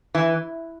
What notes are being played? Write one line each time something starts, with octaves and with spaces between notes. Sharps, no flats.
E3